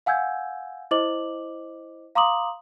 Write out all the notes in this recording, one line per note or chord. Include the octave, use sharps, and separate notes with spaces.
F5 F#5 G#5 E6 G6 G#6
E4 C5 D#5 D6 F#7
F5 A#5 C6 D6 D#6 F#7